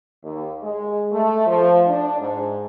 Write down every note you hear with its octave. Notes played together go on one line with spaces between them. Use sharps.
D#2
G#3
A3
F3
D4
G#2